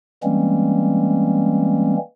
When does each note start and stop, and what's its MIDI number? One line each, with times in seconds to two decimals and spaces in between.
0.23 1.97 52
0.23 1.97 55
0.23 1.97 56
0.23 1.97 58
0.23 1.97 60
0.23 1.97 61